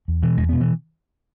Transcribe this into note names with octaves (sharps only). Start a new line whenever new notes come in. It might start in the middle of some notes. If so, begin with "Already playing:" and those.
E2
B2 E3
E2 G#3
B2 B3
E3